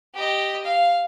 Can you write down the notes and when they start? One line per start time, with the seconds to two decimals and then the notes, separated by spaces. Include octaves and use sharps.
0.14 G4 D#5
0.65 F5